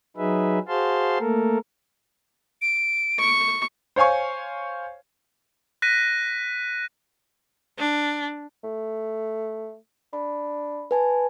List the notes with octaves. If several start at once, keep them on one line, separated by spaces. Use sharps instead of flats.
F#3 D#4 G#4 B4 E5
F#4 G#4 C5 F5 A5 C6
A3 A#3 A4 A#4
D7
C#6
C5 C#5 F5 G#5 C#6
F#6 A#6 B6 D#7
D4
A3
D4 B5
B4 G#5 A5